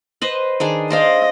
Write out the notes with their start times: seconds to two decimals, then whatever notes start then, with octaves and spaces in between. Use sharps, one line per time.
0.22 B4 C5 D#5
0.60 D#3 D4 G#4
0.90 C5 D5 D#5 F5